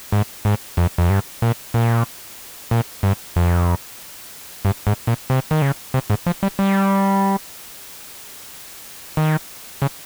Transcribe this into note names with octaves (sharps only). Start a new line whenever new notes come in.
G#2
G#2
F2
F2
G2
A#2
A#2
A#2
G2
F2
G2
G#2
A#2
C3
D#3
C#3
C3
G#2
F3
G3
G3
D#3
C#3